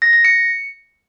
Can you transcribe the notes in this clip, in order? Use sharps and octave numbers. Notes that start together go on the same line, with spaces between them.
A#6
A#6
C#7